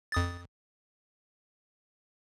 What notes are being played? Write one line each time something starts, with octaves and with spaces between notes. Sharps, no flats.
F2 D#6 A6